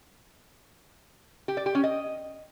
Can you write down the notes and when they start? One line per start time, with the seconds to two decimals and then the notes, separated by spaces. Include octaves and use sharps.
1.48 G4
1.57 D5
1.66 G4
1.75 C#4
1.84 D#5